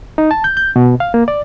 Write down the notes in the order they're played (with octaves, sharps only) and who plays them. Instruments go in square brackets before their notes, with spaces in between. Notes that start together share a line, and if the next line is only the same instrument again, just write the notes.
[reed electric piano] D#4
A5
G6
G6
B2
F5
A#3
D5